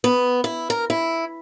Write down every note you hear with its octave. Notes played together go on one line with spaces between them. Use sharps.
B3
E4
A#4
E4